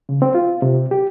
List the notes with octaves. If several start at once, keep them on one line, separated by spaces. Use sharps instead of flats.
C#3
C4
F4
C3
G4